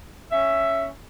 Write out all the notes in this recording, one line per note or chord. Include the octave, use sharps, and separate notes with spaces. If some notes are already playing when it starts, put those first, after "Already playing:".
C#4 E5